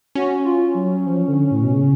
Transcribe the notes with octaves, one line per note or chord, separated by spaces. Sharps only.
C#4 F#4
F4
F#3
F3
D3
A2
B2
C#3